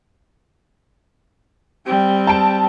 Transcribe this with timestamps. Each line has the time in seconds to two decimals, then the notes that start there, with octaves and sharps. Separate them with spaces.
1.87 G3 C4
2.27 A5 D7